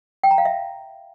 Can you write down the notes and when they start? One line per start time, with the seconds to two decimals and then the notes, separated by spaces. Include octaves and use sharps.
0.23 G5
0.31 A#5
0.38 F5
0.45 E5